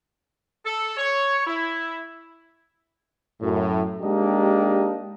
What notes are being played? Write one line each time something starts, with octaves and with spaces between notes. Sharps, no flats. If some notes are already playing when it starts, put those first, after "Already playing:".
A4
C#5
E4
F#2 A2
G#3 A#3 D4 D#4 G4